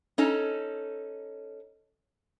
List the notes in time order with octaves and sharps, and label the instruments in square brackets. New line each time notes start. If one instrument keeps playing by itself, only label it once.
[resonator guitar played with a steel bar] C#4 D#4 A4